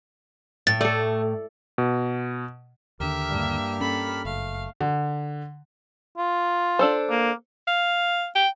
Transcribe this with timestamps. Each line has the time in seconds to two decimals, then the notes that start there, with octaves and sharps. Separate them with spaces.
0.67 A2 A6
0.81 A3 A4 D5
1.78 B2
3.00 D#2 D3 G4 A#4 E5 F6
3.29 G2 A#3
3.81 C#4 A4 B5
4.25 F#1 A3 F5
4.81 D3
6.17 F4
6.79 D4 A4 C5
7.10 A#3
7.68 F5
8.35 G5